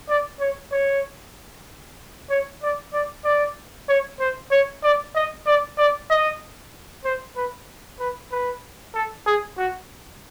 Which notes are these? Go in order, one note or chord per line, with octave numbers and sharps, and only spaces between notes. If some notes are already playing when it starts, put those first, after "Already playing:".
D5
C#5
C#5
C#5
D5
D5
D5
C#5
C5
C#5
D5
D#5
D5
D5
D#5
C5
B4
B4
B4
A4
G#4
F#4